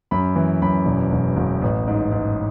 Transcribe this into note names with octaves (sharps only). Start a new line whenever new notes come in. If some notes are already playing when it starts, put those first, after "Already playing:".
F#2 B5
E3
F#2 B5
E1
E1
E1
A1
G#2
G#2